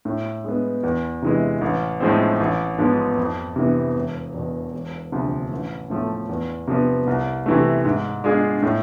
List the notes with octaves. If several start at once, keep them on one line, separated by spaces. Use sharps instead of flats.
A2
G#3 B3
E2
C3 E3 G#3
A1
A2 F3 G#3 C4
A1
G#2 F3 B3
F2
C3 E3 B3
E1
E2 B2
E1
D2 C3 F3
A1
A2 F3 A3
E2
C3 F3 B3
C2
C3 E3 A3
G#2
G#3 D4 F4 G#4
A2